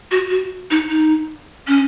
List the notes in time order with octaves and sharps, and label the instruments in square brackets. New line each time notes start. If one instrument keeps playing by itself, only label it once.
[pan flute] F#4
F#4
D#4
D#4
C#4